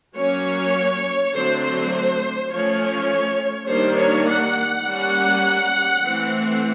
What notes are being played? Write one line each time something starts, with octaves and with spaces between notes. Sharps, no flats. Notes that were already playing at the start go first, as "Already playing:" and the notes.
F#3 A#3 C#4 C#5
D3 F#3 A3 C4 C5
C5
F3 A3 C#4 C#5
D#3 G3 A#3 D4 C5
C#5
F#5
G3 A#3 C#4
E3 A3 C4